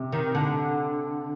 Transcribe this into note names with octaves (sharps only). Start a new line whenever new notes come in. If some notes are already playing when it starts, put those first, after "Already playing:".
Already playing: C3
D#3
D3